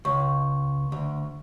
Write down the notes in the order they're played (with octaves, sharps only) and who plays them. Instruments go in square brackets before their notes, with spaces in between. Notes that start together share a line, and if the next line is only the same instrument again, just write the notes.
[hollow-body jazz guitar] C#2 [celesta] C#6
[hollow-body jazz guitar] D2